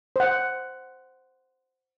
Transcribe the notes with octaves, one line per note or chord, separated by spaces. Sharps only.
C5 F#5